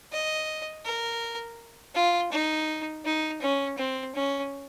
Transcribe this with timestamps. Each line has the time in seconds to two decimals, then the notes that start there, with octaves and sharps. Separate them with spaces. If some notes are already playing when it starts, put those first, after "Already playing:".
0.12 D#5
0.85 A#4
1.95 F4
2.32 D#4
3.05 D#4
3.42 C#4
3.78 C4
4.15 C#4